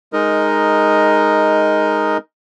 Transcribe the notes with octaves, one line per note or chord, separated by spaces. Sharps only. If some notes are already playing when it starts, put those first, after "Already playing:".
G#3 D#4 A#4 D#5